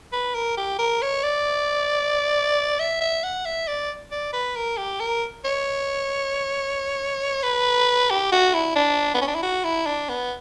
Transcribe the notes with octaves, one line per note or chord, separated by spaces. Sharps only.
B4
A#4
G4
A#4
C#5
D5
E5
E5
F#5
E5
D5
D5
B4
A#4
G4
A#4
C#5
B4
G4
F#4
E4
D4
B3
C#4
D4
E4
F#4
E4
D4
B3